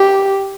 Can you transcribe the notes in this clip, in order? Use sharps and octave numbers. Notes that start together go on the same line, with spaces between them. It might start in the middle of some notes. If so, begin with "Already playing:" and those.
Already playing: G4